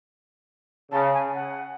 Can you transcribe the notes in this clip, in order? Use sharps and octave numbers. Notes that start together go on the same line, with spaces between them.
C#3 A5
G#5
F#5